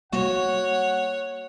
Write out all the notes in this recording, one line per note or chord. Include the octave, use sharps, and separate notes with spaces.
G3 A#3 F#4 C#5 F#5